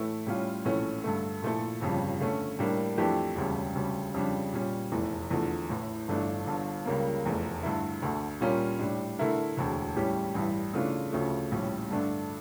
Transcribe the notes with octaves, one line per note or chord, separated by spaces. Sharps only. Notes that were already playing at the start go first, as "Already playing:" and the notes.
Already playing: A2 E3 A3 E4
A2 G3 C#4 F4
A#1 A2 E3 A3 C#4
G2 D3 A3
A#2 F3 A3 E4 A4
G1 F2 C#3 G3
D3 A3 C#4
A2 G3 A#3 D4
F2 E3 A3 D4 G4
E1 D2 C#3 G3
D2 C#3 G3
F2 C#3 G3 D4
A#2 G3 C#4
F1 E2 E3 A3
E2 D3 F3 A3
A1 A2 E3
G1 G2 E3 A3 D4
G1 G2 D3
C#2 C#3 G3 A#3
F1 E2 E3 A3
G2 D3 A3 E4
D2 D3 A3
A#2 G3 C#4 F4 A#4
A2 G3 D4
D3 A3 E4 A#4
E1 D2 D3
A2 E3 G3 C#4 G4
A1 G2 E3 G3
C#3 E3 A3 D4 F4
D2 C#3 F3 A3
A#1 A2 G3 C#4
G2 D3 A3 D4